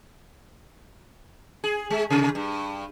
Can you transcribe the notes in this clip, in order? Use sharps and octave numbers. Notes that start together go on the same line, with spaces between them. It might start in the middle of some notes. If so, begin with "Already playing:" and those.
G#4
G#3
C3
G2